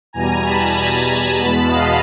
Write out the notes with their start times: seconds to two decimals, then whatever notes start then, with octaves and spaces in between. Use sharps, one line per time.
0.13 E2 B2 G3 G#5 A#5
0.44 A5 B5
0.77 G#5 A#5
1.39 E2 B2 G#3 B3 A5 B5
1.70 D#5 F5